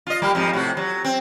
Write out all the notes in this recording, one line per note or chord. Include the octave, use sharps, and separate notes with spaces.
F4 D#5
G3 A#3 G4
F2 G#2 F3
A2 C3 F#4
F#3
C4